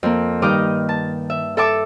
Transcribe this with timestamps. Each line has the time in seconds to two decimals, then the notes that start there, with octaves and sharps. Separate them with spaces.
0.03 F2 A#3
0.42 G2 D#3 D#4 D#5 D6 F6
0.89 A5
1.30 E5
1.57 A4 E5 A5 D6 E6